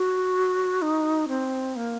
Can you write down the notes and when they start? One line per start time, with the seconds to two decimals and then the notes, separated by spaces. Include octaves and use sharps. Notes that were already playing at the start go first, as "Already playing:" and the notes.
Already playing: F#4
0.82 D#4
1.28 C4
1.76 A#3